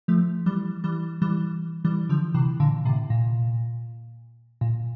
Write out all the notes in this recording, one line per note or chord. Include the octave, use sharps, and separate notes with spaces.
F3 A3
E3 G3
E3 G3
E3 G3
E3 G3
D3 F3
C3 E3
A#2 D3
A2 C3
A#2
A#2